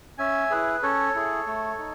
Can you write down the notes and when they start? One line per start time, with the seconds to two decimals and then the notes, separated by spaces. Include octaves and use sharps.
0.18 C#4 E5 G#5
0.50 E4 G#4 B4
0.83 C#4 A4 C#5
1.15 E4 G#4
1.47 A3
1.79 D#4